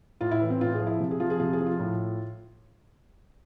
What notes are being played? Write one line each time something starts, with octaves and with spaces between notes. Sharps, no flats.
A2 F4
E4
E3
C4
A2 F4
G#4
F3
E4
C3
G#4
F3 F4
G#4
C3 F4
G#4
F3
F4
A2